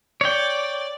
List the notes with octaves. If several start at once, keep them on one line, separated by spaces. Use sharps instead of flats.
C#5 D5 G5